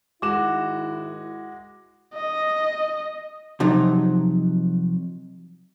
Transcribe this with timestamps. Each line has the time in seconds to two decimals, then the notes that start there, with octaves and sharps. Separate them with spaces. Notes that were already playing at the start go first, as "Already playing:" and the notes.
0.22 G#2 D#3 G#3 E4 F#4 D6 E7
2.14 D#5
3.60 C3 F3 F#3 D#4